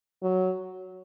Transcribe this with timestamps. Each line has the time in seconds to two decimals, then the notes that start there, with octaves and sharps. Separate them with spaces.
0.23 F#3